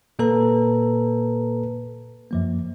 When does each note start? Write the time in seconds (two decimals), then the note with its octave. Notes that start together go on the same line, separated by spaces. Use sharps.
0.19 A#2 A#3 A4 B4 A#5
2.31 F#2 F3 A#3